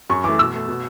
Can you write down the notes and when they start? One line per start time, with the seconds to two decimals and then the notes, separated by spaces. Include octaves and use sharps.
0.10 F#2 C#6
0.24 E3 A3 D6
0.39 B2 E6
0.53 A3
0.68 B2